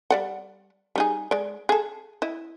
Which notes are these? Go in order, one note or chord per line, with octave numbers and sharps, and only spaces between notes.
G3 D5 F#5
G3 D#4 G#4
G#3 D5
G#4 A4
E4 D#5